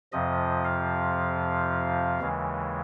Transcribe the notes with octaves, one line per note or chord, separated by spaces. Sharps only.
F2 C3 F3 D#5
F5
D#2 C#3 E3 G#3